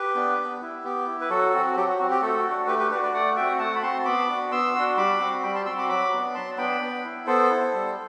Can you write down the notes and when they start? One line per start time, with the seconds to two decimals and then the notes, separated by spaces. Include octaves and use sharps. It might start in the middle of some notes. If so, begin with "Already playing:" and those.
Already playing: G4 B4
0.15 B3 D4
0.38 B3
0.61 E4
0.83 B3 G4
1.07 E4
1.21 B4
1.29 F#3 F#4 A4
1.53 C4 F#4
1.76 F#3 G4
1.87 F#4
1.98 C4 F#4
2.10 G4
2.21 A3 F#4 A4
2.44 D4 F#4
2.67 A3 G4 B4
2.79 G4 B4
2.90 D4 G4 B4
2.94 F#4
3.02 B4 D5
3.13 A3 D5 F#5
3.36 C4 F#4 E5 G5
3.59 A3 F#5 A5
3.75 B5
3.82 C4 F#4 A5 C6
4.05 B3 B5 D6
4.29 D4 F#4
4.51 B3 C6 E6
4.74 D4 F#4
4.97 G3 B5 D6
5.20 C4 F#4
5.43 G3 G5 B5
5.55 A5 C6
5.65 C4 F#4 C6 E6
5.78 B5 D6
5.89 F#3 B5 D6
6.13 B3 D4
6.34 F#3 A5 C6
6.57 B3 D4 G5 B5
6.81 B3
7.04 E4
7.26 B3 A4 C5
7.50 E4
7.73 G3